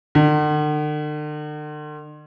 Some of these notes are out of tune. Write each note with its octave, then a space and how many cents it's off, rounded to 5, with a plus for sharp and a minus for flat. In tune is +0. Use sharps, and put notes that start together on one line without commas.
D3 +45